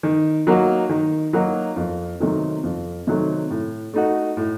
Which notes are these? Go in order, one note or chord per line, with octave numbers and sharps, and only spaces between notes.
D#3
F#3 A#3 D#4 F#4
D#3
F#3 A#3 D#4 F#4
F2
C3 D#3 F#3 A3
F2
C3 D#3 F#3 A3
A2
A3 D#4 F#4
A2